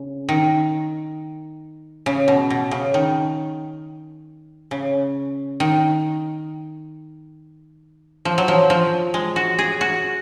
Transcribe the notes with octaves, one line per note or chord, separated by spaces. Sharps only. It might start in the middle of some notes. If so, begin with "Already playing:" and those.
Already playing: C#3
D#3
C#3
B2
B2
C#3
D#3
C#3
D#3
F3
F#3
F3
F3
G#3
F#4
G#4
F#4